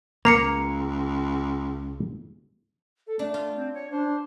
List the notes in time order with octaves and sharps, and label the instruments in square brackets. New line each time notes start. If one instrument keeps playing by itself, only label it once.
[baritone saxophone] C#2 [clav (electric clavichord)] A#3 [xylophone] A#5 C7 C#7
[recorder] A4
[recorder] A3 [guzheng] D4
[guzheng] F4
[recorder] C4
C#5
[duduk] D4 [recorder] C5